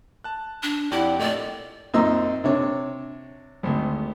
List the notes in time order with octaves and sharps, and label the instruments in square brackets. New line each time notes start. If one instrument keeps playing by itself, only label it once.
[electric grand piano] A5 F#6
[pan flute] D4
[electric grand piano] F2 F#5 [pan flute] E4 [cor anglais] G4 [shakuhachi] D5
[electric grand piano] A#2 A3 [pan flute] D5 [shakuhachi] D#5
[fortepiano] F#2 A#2 A#3 C4 D#4 E6
C3 D4 C#5
G#1 D2